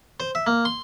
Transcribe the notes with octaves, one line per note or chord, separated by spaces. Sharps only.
C5
E5
A#3
C6